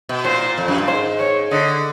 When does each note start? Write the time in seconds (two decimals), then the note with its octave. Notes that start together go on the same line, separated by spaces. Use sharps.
0.09 B2
0.25 A#2 C5
0.58 F2
0.68 F#2
0.78 G2
0.88 G#2 C5
1.19 C#5
1.51 D3 D#5